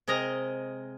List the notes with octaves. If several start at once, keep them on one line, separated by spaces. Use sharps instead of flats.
C3 G#3 A#4 D#5 A#5